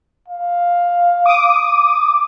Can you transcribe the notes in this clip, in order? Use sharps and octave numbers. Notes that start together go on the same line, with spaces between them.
F5
D6 D#6